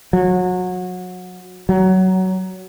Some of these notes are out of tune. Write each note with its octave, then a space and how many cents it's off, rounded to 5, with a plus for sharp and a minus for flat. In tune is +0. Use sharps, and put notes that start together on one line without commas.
F#3 -25
F#3 +20